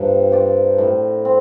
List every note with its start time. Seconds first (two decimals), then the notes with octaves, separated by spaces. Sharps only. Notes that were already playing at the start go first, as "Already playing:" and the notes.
Already playing: G2 F3 A#3 D4 G4
0.32 C4 G4 D5
0.78 A2
1.25 C4